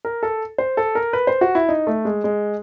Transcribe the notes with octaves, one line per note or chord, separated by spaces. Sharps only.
A#4
A4
C5
A4
A#4
B4
C5
F#4
E4
D#4
A3
G#3
G#3